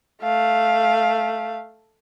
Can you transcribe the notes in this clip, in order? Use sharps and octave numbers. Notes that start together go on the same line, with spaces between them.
A3 F5